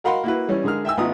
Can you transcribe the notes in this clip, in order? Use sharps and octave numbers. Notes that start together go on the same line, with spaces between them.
F#4 A#4 F5 F#5 B5 C6
A#3 E4 F#4 B4
E3 G3 C#4
D3 G#3 G#4 A#4 F6
E5 G5 G#5 E6
A1 B3 F4 A#5 D#6